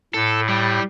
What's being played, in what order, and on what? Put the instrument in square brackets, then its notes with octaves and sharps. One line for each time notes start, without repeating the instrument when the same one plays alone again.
[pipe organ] A2 [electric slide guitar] A4
[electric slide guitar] G3